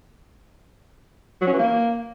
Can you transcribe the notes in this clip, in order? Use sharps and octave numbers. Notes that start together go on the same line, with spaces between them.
F#3
C#4
E3
A#3